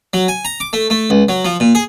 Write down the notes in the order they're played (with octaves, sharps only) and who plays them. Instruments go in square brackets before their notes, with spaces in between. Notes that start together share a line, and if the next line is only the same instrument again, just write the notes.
[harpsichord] F#3
G#5
A#5
D6
A3
A3
C#2
F#3
F3
A#2
G#4